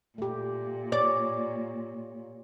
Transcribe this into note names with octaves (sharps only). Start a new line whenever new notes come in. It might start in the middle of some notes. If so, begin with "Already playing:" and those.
A#2 A3 G4
C#5 D5